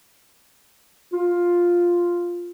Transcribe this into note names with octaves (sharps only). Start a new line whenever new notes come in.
F4